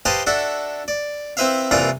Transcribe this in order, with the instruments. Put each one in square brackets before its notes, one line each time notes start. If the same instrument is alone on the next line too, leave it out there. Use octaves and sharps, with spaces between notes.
[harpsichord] G4 B4 C5 D#5 F5 A5
D4 F#4 A4 E5
D5
C4 E4 B4 C5 E5 F5
C2 E3 A#3 F4 D5 A#5